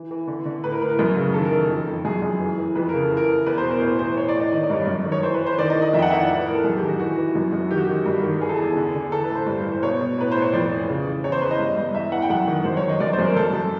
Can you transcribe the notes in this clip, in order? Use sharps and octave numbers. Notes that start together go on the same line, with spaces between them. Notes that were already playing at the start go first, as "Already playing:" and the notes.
Already playing: E3
E3
D3
D3
A2 B4
A#4
A2 B4
A#4
F#2
C#3
D#3 A4
A#4
D#3
A4
F2
F2
F#2 G#4
F#2
E3
E3
F2 B4
C#3 A#4
A4
E3
A#4
E3
E2 B4
C5
B2
A#4
A2 C5
E3 C5
E3 C#5
D5
A2
D#5
D#3 D#5
D5
G2 C#5
F#2 D5
D#3
C#5
E3 C5
B4
E3
C5
D#3 D5
D#5
D#3
D#5
F2 E5
G5
F#5
E3 E5
D5
A2
B4
A2 A#4
A4
F#2 G#4
G4
D#3
F#4
E3 F#4
E3
F#2
F#2
D#3 G4
F#4
D#3 G4
G2
D#3
E3 G#4
A4
E2 G#4
D3
D3
E3 A4
B4
A2
C5
G2
E3
C5
B2 C#5
B2
A2 B4
A2 C5
C#5
F2 D5
E3
C#3
E3
E2 C#5
C5
E2 B4
D#5
G2
G2
E2 E5
E3 F#5
G5
F#2 F#5
D#3
F#2 C5
C#5
D#3
D#5
F#2 D5
C5
F#2
A#4
F#2 A4
F#2